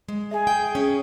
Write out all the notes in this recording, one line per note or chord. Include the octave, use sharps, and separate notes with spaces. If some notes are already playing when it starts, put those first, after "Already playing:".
G#3
G#4 E5 G#5
G5
C#4